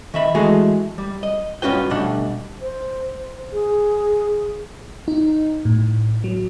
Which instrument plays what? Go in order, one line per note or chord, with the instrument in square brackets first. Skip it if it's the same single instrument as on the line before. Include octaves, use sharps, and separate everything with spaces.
[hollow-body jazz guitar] D#3 E5 B5
E3 G#3 A3 F#4 G#4
G3
D#5
G2 C#4 F4 F#4 B4 G5
D2 B2 G3 D4 F#5
[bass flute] C5
G#4
[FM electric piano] D#4
A2
F#3